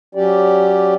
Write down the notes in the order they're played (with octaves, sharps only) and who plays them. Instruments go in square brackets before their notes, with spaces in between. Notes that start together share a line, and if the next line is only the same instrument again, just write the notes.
[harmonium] F#3 C#4 G4 D5